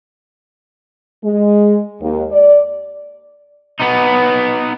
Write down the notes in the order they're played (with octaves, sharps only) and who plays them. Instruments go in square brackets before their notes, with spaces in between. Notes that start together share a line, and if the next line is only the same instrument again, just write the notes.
[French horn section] G#3
D#2
D5
[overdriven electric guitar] B3 D#4